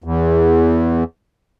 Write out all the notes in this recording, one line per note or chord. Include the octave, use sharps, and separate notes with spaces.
E2